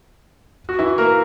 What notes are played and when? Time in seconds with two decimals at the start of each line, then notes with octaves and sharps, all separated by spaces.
0.69 F#4
0.79 E3 E4
0.98 A#3 A#4